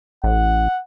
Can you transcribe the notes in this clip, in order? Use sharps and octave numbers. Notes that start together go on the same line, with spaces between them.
A1 F#5